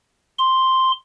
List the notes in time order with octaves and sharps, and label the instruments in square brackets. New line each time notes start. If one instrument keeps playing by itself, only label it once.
[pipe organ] C6